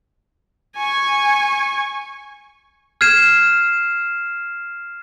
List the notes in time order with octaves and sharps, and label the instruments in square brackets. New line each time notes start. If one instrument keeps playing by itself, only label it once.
[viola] G#5 C#6
[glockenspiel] F6 G6 G#6 C7 D#7 E7